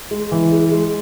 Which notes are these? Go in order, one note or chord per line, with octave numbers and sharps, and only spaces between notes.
G#3
E3
G#4
G#3